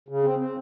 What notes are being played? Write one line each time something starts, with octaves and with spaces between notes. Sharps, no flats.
C#3
C4
C4